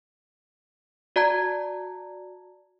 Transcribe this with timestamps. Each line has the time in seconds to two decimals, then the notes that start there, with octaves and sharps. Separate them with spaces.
1.16 F#4 D5 A5 A#5 G#6